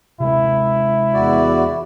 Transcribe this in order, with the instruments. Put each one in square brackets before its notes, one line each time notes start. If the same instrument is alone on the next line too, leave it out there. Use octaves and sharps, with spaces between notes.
[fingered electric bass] C3 G#3 [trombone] E4
[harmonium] E2 F#4 D5